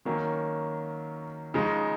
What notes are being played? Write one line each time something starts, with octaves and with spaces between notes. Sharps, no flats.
D#3 F#3 A#3 C#4
C#3 F3 G#3 D#4